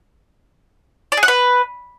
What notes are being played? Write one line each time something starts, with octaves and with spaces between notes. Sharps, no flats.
D5
G#4
F#5
B4